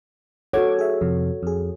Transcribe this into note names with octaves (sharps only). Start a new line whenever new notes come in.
F#4 A4 C#5 F#5 D6 G#6
G#4 E5
F2 C3
F2 G#4